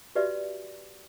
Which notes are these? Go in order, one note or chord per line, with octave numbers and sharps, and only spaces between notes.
F#4 G4 B4 D5 E5